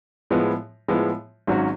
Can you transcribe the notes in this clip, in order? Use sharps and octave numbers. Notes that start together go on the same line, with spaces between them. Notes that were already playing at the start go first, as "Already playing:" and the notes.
A2 F3 G#3 B3
A2 F3 G#3 B3
G#1 G#2 F#3 C#4 F#4